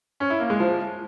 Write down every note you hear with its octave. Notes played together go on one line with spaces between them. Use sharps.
C#4
E4
A#3
G#3
F3